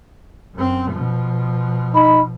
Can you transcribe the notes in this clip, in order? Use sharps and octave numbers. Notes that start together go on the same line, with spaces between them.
F#2 C4
B2 F3
D#4 B5